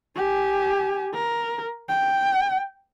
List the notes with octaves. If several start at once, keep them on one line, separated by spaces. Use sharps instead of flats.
G4 G#5
A#4
G5